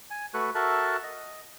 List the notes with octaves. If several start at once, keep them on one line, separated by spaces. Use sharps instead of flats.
G#5
A3 F#4 A4 B4 C#6 F#6
F#4 A4 A#4 E5 A5 F#6
D#5